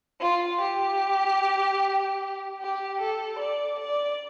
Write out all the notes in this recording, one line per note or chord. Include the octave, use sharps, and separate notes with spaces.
F4
G4
G4
A4
D5
D5